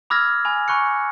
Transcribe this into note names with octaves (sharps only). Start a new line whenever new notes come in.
B5 D6 E6 F6 G#6 A#6
G#5 B5
G#5 B5 C#6 F#6 C#7